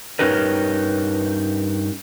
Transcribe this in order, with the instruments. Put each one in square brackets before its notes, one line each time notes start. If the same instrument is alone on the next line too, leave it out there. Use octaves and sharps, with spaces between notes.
[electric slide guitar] G2 C#4 D#4 G4 A#4 B4